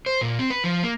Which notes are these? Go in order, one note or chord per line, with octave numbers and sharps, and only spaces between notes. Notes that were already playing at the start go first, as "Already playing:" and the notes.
C5
A#2
C4
B4
F3
A#3